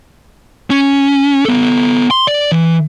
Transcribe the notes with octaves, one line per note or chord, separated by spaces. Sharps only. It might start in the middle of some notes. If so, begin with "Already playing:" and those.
C#4
B3 A4
C6
D5
E3